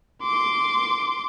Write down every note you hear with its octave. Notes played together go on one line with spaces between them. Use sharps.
C6 D6